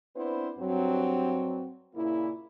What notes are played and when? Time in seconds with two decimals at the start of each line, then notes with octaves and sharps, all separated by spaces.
0.16 B3 C4 D4 E4 B4 C5
0.58 G2 F#3 C4
1.95 A#2 C#3 A#3 E4